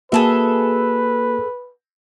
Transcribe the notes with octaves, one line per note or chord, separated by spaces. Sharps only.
A#3 F#4 G#4 A4 B4 E5